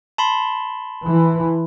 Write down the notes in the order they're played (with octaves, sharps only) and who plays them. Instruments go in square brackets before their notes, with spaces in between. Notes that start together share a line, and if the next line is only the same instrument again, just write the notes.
[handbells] A5 B5 C6
[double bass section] E3